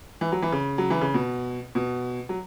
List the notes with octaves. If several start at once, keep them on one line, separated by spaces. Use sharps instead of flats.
E3
F#3
E3
C#3
F#3
E3
C#3
B2
B2
F#3